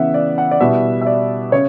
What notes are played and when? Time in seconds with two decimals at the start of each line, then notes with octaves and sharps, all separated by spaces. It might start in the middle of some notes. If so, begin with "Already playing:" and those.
Already playing: C#3 E3 B3 E5 F#5
0.14 D5
0.38 F#5
0.51 D5
0.61 B2 G3 B3 E4 E5
1.01 E5
1.07 D5
1.52 C#3 C#5